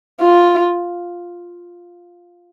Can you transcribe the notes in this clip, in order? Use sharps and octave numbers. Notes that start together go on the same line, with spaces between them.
F4